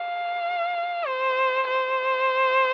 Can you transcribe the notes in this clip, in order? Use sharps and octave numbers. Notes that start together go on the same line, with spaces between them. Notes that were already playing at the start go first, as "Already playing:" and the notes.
Already playing: F5
C5
C5